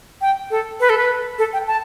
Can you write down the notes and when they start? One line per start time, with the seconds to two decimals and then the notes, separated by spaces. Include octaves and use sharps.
0.21 G5
0.51 A4
0.80 B4
0.89 A4
0.98 B4
1.38 A4
1.53 G5
1.67 A5